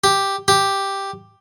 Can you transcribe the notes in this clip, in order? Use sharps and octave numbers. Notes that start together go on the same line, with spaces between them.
G4
G4